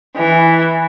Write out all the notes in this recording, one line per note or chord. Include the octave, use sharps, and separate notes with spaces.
E3